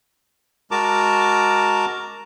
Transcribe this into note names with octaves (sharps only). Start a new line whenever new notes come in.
G#3 F#4 A#4 A5 A#5 D6